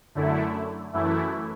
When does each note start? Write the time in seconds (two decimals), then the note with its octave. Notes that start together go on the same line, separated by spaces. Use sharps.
0.15 F#2 D3 A3 E4
0.93 F#2 E3 A3 E4